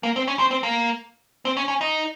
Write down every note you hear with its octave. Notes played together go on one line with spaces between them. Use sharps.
A#3
C4
C#4
C4
C4
A#3
C4
C#4
C#4
D#4